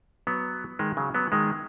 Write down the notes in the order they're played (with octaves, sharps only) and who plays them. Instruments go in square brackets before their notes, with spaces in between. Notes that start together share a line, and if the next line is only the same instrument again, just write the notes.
[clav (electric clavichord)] F#3 B3
D#3 G#3
C#3 F#3
F#3 B3
D#3 G#3